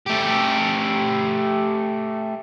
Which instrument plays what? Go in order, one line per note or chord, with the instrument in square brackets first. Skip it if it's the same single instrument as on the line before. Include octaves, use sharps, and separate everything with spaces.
[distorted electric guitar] A3 G4